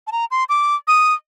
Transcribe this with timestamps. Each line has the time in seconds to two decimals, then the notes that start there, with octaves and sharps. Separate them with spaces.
0.07 A5
0.12 A#5
0.31 C6
0.49 D6
0.87 D#6